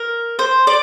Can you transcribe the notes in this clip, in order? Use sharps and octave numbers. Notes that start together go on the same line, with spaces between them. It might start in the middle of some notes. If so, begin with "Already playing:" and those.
Already playing: A#4
C5
D5